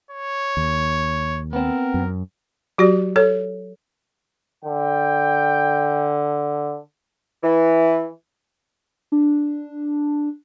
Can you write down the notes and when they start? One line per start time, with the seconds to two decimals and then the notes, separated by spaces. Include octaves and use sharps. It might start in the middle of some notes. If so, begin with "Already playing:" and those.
0.11 C#5
0.57 D#2
1.53 B3 C4 A#4
1.94 F#2
2.78 F#3 F#4 G4 D5
3.16 A4 C#5
4.65 D3 G5
7.43 E3
9.12 D4